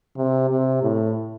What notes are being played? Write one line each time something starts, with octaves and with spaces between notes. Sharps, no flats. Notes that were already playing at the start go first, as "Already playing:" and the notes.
C3
C3
A2